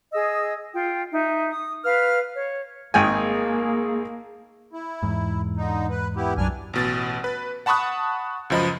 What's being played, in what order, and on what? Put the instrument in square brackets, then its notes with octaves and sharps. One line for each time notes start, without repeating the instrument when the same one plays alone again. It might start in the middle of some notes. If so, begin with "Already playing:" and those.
[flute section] G#4 D#5 E6
F4 G5
D#4 E5
D#6
B4 F5 F6
C#5
[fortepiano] G#1 G5 G#5 [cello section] A#3 [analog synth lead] G#4
[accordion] E4
[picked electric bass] E2 G#2
[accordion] D3 D#4
B4
B3 E4 G4
[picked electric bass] B1 F#2 F#3 [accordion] D4 G#5 F6
[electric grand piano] A1 B2 A6
B4
F#5 A5 B5 C#6 D#6 F#6
C#2 F#2 F3 D#5 B5